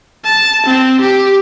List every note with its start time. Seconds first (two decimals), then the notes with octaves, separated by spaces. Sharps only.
0.25 A5
0.66 C4
1.01 G4